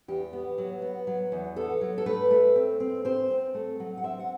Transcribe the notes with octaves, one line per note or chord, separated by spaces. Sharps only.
E2 G4
B3
F#3
B3
F#3
E2
B3 A4
F#3
A4
A3 B4
A3
C4
C4
C4 C5
C4
A3
F#3
F#5
C4 E5
F#5